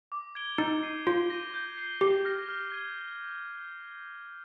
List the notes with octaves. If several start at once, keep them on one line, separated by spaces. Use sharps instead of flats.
D6
G#6 D7 G7
D#4 G6
C7 D#7
F4 G6
A#6 D#7
G6
C7 G7
G4 D6
F6 A#6
F6
G#6 D#7